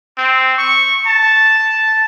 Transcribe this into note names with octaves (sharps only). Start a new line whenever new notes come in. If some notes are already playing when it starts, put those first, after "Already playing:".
C4
C#6
A5